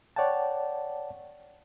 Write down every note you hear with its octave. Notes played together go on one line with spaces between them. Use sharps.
C#5 D5 F#5 G5 A5